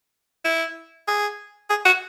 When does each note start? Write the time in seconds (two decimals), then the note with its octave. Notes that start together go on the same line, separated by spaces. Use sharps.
0.45 E4
1.08 G#4
1.70 G#4
1.85 F#4